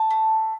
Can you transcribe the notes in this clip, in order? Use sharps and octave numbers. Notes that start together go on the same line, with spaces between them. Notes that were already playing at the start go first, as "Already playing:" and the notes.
Already playing: A5
A3